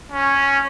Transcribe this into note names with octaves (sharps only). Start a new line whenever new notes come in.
C#4